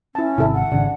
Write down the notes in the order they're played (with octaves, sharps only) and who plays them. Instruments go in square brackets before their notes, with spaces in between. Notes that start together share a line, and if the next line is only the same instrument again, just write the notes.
[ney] C#4 [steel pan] E4 A5
[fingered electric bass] G#1 C3 [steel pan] E4 A4 E5
[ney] F#5
[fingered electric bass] G#1 C#3 [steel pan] D4